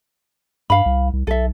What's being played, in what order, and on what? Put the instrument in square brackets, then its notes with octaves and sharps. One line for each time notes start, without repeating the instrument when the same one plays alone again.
[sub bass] G2 [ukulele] F5 B5
[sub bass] C2
C2
[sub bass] B1 [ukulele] A4 E5